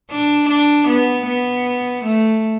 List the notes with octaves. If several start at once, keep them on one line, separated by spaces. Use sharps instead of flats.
D4
D4
B3
B3
A3